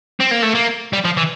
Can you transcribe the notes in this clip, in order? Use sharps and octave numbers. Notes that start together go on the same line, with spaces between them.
C4
A#3
A3
A#3
G3
F3
E3